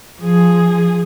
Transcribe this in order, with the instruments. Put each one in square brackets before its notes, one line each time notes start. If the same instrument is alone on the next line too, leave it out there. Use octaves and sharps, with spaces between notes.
[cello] F3 G#4